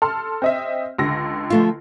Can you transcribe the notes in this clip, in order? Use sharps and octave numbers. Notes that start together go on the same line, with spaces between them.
A4 C6 F6
C4 D#5 E5
C#2 D3 A#6
F3 A3 F4